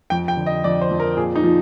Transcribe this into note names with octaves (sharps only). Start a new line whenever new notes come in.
F2 G5
G5
D3
D#5
F2 D5
C5
F2
A#4
A#2 G#4
D#4
F3